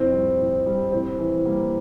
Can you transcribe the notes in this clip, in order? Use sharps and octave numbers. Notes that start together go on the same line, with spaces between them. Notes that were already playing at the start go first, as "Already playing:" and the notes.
Already playing: F2 A2 C4
G3
A2
G3
A2 C4
E3
G3 A#3